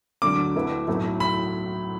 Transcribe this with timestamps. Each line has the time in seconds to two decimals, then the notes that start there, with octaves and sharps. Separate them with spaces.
0.22 D2 D3 F#3 D4 D6
0.56 D2 D3 A3 E4 B4
0.88 B1 A2 F#3 A3 E4
1.20 B5